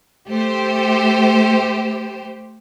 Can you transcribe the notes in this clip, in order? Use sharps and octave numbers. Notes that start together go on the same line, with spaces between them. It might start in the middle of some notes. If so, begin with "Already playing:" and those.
A3 G4 C5